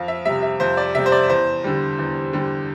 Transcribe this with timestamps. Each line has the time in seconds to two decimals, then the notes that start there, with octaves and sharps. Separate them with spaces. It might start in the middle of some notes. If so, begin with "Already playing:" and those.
Already playing: F2 F5
0.08 E5
0.25 C3 G3 E5
0.43 E5
0.60 F2 C5
0.77 D5
0.95 C3 G3 E5
1.06 C5
1.12 D5
1.29 E2 C5
1.64 D3 G3
1.99 E2
2.33 D3 G3